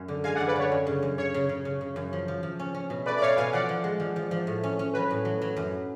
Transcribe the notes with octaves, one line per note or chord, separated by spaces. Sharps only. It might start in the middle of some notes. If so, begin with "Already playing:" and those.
Already playing: F#2
D3
G#3 F5 G#5
F#2 D5 F#5
B4 D5
D3 C#5
F#2
C#3
F#2
C#3 C#5
C#3
C#3
C#3
C#3
F#2
F3
F3
F3
C#4
C#4
B2
A3 B4 D5
D5
B2 C#5 F5
B2 F5 G#5
F3 D5 F#5
F3
G#3
F3
F3
F3
A2
C#4
C#4
F#3 B4
A2
F#3
F#3
F#2